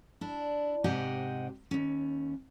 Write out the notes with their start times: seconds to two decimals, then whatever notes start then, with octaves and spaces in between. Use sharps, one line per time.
0.21 D4 E4
0.84 G#2 C3 G4 D#5 F#5 G#5
1.71 D#2 C#4